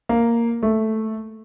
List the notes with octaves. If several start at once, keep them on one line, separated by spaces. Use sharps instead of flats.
A#3
A3